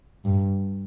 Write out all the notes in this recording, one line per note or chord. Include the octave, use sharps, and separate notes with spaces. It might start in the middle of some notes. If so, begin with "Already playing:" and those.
G2